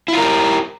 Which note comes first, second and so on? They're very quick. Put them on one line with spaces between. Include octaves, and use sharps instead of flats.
E4 F4 A#4 G4